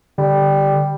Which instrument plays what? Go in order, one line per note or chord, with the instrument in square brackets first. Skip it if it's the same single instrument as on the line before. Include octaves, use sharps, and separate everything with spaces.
[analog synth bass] D3 [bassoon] G3